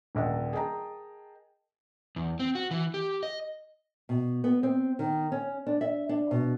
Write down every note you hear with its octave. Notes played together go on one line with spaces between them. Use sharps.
D#1 A#1 F#5
G#4 A#4 D#5 G5 A5 A#5
E2
C4
F#4
E3
G4
D#5
B2
B3
C4
D#3
C#4
D4
E5
D4
B2